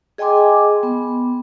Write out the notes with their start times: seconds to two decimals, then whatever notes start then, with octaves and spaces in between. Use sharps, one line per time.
0.18 G#4 D#5 G5 G#5 C6 D6
0.83 B3